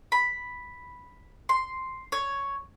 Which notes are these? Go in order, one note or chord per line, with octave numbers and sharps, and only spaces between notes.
B5
C6
C#5